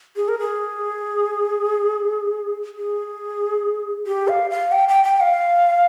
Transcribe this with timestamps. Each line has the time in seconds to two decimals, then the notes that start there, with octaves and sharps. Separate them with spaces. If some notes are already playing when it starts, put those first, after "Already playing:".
0.16 G#4
0.28 A#4
0.39 G#4
2.77 G#4
4.07 G4
4.28 F5
4.51 F5
4.72 G5
4.89 G5
5.04 G5
5.20 F5